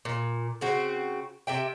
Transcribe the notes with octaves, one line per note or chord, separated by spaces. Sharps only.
A#2
C#3 C4 F#4
C3 E5 G5